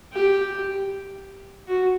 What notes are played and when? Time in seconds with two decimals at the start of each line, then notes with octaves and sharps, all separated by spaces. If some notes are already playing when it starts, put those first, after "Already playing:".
0.13 G4
1.68 F#4